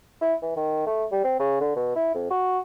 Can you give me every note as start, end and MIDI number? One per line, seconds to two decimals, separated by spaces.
0.21 0.34 64
0.42 0.56 52
0.56 0.82 51
0.86 1.05 57
1.12 1.23 55
1.24 1.38 60
1.39 1.56 49
1.61 1.71 50
1.76 1.91 47
1.96 2.13 64
2.14 2.29 41
2.30 2.59 66